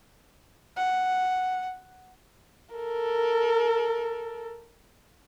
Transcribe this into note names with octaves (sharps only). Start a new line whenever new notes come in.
F#5
A4 A#4